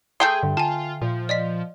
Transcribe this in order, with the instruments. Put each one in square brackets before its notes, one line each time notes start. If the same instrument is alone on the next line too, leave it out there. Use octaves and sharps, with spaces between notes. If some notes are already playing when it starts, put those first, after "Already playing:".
[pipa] A3 G5 C6 [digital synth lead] G#4
[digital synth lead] G2 [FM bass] D3
[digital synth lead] F4 [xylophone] G#5 A5
[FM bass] A#2 [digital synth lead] F3
[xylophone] D5 D#5 B6